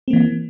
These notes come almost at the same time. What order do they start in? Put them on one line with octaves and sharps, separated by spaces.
C4 A#3 E3